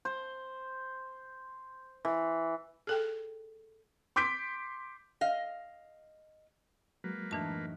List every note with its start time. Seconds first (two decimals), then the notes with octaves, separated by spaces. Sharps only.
0.05 C5
2.05 E3
2.87 G#4 A4 G5
4.16 C6 D6 G6 B6 D7
5.21 D#5 F5
7.04 F#3 G#3 A#3 B4
7.31 F#2 A2 E3 D4 D#4 A5